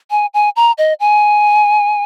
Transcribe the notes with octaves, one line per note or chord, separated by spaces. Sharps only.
G#5
G#5
A#5
D#5
G#5